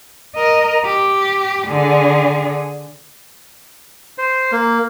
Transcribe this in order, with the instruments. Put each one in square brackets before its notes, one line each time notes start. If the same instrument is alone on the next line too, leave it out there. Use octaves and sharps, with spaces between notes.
[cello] A#4 D#5
G4
D3 G#4
[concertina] C5
A#3